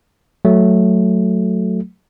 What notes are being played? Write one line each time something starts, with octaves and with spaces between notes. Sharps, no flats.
F#3 A3